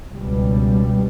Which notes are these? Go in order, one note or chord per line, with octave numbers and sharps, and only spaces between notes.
C#2 B2 G3